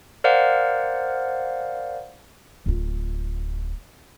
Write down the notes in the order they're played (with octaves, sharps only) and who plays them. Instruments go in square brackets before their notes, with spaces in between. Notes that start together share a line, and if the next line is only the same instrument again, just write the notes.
[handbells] A#4 C5 D5 F5 F#5
[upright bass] D1 F4